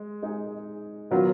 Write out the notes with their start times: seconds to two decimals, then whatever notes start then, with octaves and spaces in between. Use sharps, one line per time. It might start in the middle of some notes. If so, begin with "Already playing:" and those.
Already playing: G#3
0.22 G#3 D#4 G#4
1.11 D#3 F#3 B3 F4